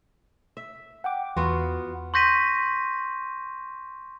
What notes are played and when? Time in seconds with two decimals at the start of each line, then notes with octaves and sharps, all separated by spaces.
0.57 E5
1.04 F#5 G5 D6
1.37 E2 B3 F4 F#4
2.14 C6 C#6 G6 A#6 B6 D#7